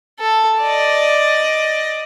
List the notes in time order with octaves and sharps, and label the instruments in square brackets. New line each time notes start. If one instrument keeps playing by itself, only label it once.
[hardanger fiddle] A4
D5 D#5